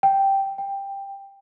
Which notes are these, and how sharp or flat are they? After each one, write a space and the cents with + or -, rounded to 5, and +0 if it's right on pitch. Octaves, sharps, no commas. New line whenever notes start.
G5 -5
G5 +10